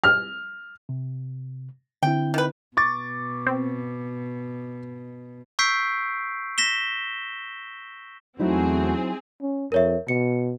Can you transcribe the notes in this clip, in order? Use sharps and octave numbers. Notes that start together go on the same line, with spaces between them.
F6
C3
D3 C4 E4 G5
D#3 B4
B2 C#6 D6 A6
C4
C#6 E6 G6 B6 C7 D7
A#6 B6 E7 G7
E2 F#3 A3 C4 D#4 E4 F#4 G#4
C#4
F2 A#4 C#5 E5
B2 C#7